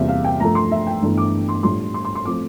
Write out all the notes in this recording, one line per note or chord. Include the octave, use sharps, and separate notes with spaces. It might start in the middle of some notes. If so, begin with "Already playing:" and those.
Already playing: E2 C3 G3 A#3 F4 C5 E5
F5
G5
G2 F3 A3 A#5
C6
E5
G5
G1 G2 E3 A3
D6
C6
A2 G3 D4 F4 C6
C6
C6
C6
F3 A3 C4 D6